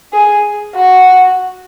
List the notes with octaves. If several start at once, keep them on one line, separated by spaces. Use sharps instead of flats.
G#4
F#4